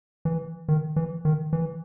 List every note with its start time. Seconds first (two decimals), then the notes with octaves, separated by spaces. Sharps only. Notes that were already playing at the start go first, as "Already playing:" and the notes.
0.25 E3
0.68 D#3
0.96 E3
1.25 D#3
1.53 E3